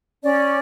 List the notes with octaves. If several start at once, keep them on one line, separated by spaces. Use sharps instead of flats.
C#4 D5